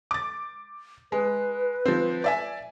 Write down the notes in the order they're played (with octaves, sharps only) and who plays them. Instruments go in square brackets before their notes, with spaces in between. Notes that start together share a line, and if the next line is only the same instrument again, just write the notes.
[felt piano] D6 A6
[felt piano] G#3 [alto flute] B4
[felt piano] F3 C4
D5 E5 G#5